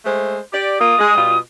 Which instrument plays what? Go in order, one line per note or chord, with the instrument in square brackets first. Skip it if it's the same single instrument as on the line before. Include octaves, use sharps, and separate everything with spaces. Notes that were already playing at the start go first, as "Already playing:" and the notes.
[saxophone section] G#3 A3 C5
G4 D5
[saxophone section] A#3 F4 [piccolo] D#6
[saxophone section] G#3
B2 G3 F4